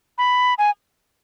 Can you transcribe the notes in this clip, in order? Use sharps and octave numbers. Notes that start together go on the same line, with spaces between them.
B5
G#5